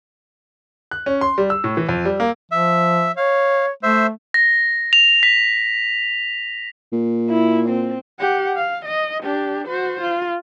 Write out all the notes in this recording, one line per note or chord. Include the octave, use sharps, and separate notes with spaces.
F#6
C#4
C6
G3
E6
A2
E3
F2
G3
A#3
F3 E5
C#5 F5
A3 C5 E5
A#6
F7
B6
A#2
E4
C4
G4 F#5
F5
D#5
D4 G4
F#4 C5
F4